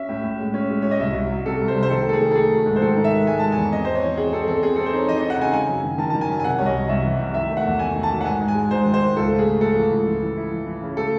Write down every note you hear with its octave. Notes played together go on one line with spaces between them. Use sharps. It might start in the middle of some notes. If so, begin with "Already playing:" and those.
Already playing: C#4 E5
A2
A2
G#3
C#4
G#3
A2 C#5
D#5
C2 E5
C2
F#3
C3 A4
C2
C5
C2
C5
D#3 A4
A3 A4
G#4
D#3
A4
A3 G#4
F#3
G#2
C5
D#3 A4
D#3
E5
G#3
G#3 G#5
G#3 A5
E2 G#5
C4 D#5
C4 C5
C#5
E3
C4 G#4
C4 A4
E2 A4
C4 G#4
C4 A4
C5
D#4 C#5
E3 D#5
D#4 D#5
F#5
C#3 G#5
F#3 G#5
F#2
D#3
D#3 A5
D#3 A5
G#5
F#2
G#5
C3 F#5
C2 C#5
D#5
C2
C2 E5
E3
C3
D#3 E5
A3
F#5
E2
A3 G#5
D#3
A5
F#3
F#5
G#2 G#5
G#2
G#5
G#3
G#2 C5
D#3
C5
G#2
C#2 A4
A3
G#4
A3
A3 A4
E3
C#2
E3
E3
E4
E3
E3
C#3
A3 A4